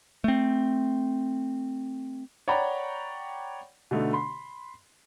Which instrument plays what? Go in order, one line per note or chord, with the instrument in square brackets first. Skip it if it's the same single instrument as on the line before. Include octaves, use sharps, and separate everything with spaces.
[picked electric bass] A3 C4
[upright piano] C#5 D5 F#5 G5 A#5 B5
B2 D3 A3 D#4
B5 C6